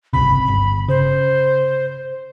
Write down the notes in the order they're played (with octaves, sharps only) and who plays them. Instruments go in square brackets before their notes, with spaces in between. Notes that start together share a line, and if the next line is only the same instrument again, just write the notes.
[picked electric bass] G1 C#2 C3 [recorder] B5
[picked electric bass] G1
[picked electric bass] C#3 [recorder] C5